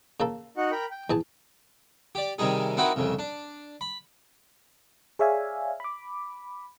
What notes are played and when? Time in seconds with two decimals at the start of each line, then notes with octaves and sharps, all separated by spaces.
0.20 C#3 A#3 A4
0.57 D#4 F#4 F#5
0.71 A#4 G5 B5
0.91 G5
1.10 E2 G#4 A5
2.15 G4 D5
2.38 C3 D#3 G3 D#4 G#4
2.77 C4 D#4 E4 F#4 A#4 B4
2.96 C2 F2 C#3
3.19 D4
3.81 B5
5.19 G#4 C#5 D5 E5 F5 G#5
5.80 B5 D6